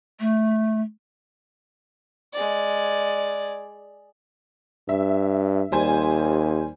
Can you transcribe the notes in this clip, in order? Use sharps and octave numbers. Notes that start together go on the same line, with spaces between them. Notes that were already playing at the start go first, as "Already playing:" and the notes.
A3
G#3 D5
G2 E5
D#2 G3 C5 G#5